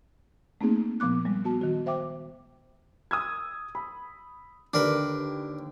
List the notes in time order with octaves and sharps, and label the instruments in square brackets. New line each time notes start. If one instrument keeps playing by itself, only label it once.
[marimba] A3 A#3 C4 D#4 G#4
A#2 F3 B3 D6 F#6
G3 G#3
B3 F#4 A5
D#3 F#4
C5 E5 G5 D6
[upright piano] D#6 E6 G#6
B5
[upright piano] D#2 D3 [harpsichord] D4 A#4 B4